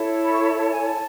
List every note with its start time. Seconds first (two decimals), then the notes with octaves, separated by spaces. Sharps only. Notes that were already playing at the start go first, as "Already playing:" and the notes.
Already playing: E4 A4 C#5
0.23 B5
0.33 C#6
0.43 B5
0.57 A5
0.71 G#5
0.85 A5